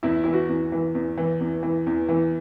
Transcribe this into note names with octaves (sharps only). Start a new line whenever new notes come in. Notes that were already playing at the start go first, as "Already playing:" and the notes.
E2 E4
E3 E4
F#4
E2
E3
E2
E3
E2
E3
E2
E3